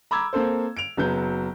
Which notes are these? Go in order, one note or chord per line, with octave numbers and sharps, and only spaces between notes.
A#5 B5 D6 E6 G#6
A#3 C4 A4 C5
D7 F7
F#1 F#3 B3 G6